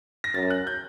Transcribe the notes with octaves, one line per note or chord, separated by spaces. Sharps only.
A#6
F#2 A6
F#6
G6